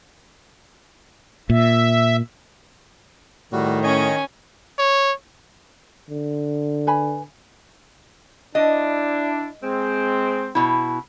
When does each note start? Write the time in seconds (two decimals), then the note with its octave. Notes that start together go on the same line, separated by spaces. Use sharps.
1.50 A#2 E5
3.52 A2 D#3 G3 F#4
3.83 C#4 C#5 D#5 G#5
4.79 C#5
6.10 D3
6.87 B4 G#5 B5
8.55 D4 E4 D#5
9.63 G#3 C4
10.55 B2 E4